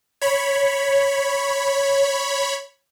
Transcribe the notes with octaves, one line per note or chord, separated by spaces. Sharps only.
C#5 B5